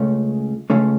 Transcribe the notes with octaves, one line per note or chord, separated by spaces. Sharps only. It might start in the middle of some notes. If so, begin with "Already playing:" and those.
Already playing: C#2 C#3 A3 C#4
C#2 C#3 A3 C#4